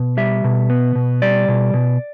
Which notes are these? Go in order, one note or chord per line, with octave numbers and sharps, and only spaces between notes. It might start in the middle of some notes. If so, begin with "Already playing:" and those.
Already playing: B2
G3 E5
B2
B3
B2
G3 D5
B2
B2